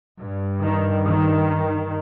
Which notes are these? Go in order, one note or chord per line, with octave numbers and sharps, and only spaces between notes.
G2
D#3
D#3